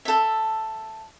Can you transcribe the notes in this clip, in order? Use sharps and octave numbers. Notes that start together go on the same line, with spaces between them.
A4 E5